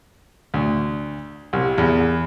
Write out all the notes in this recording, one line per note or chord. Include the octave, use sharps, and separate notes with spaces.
D2
C2
E2